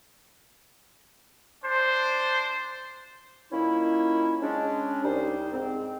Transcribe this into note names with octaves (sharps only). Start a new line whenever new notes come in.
D4 C5
A#2 D#3 A#3 C#4 E4
G#3 C#4 D4
C2 G3 D#4 C5
G#2 C4